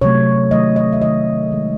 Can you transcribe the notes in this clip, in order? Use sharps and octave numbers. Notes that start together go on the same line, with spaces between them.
C3 F#3 A3 C#5
D#3 F#3 A3 D#5
D#5
E5
D#3 A3 D#5
D#3 G#3